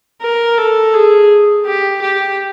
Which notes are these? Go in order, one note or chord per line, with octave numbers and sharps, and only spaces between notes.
A#4
A4
G#4
G4
G4